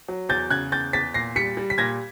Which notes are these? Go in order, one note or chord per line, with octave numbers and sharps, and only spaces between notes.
F#3
E2 G6 A6
C#3 F#6 G#6
E2 G6 A6
E2 A6 B6
A#2 A#6 C7
G3 B6 C#7
G3
B6
A#2 G#6 A#6